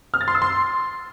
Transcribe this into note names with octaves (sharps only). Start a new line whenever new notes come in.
F6
A6
C6
E6
C6